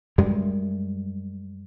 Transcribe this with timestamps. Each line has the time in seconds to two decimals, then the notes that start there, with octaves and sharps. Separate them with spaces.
0.18 F#2 G3 G#3